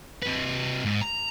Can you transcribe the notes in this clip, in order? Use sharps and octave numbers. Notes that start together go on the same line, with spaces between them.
C3 B4
G#2
A#5